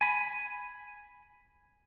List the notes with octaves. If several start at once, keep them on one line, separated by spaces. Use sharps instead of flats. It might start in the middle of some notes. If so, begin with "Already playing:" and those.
G#5 B5